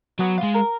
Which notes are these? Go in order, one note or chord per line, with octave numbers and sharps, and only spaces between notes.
F#3 B3
F4
G#3
A#4